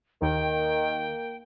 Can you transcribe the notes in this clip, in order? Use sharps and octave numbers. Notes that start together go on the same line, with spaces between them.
D#2 D#3 A#3 G5